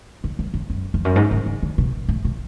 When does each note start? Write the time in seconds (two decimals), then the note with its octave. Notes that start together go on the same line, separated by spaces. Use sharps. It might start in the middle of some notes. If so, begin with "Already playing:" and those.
0.24 G#2
0.39 F#2
0.54 F2
0.70 F#2
0.94 F2
1.05 F#2
1.16 G#2
1.31 A2
1.46 D3
1.63 D3
1.78 B2
2.09 A2
2.25 B2